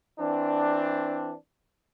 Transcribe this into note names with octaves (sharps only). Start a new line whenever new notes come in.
E3 C4 D4